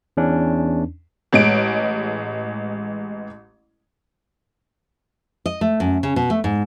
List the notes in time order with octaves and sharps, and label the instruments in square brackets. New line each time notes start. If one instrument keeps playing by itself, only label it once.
[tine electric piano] E2 C#4 D4
[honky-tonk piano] A1 G#3 D7
[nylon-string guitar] D#5
A3
F#2
C#3
B2
A3
G#2